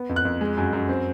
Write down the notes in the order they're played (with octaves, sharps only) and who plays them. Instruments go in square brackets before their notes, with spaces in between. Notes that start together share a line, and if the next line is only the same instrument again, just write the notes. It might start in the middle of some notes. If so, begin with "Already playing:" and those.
Already playing: [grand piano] B3
F2
F#6
F2
G#3
F#2
F#2
C4